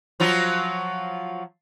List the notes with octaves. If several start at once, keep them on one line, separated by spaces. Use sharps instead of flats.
F3 F#3 F4